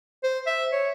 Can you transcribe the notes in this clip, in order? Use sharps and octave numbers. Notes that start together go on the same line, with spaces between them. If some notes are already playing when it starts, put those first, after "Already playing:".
C5
E5
C#5